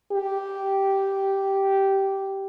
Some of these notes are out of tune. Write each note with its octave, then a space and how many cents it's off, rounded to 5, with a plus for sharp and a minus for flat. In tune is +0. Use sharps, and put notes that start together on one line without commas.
G4 -10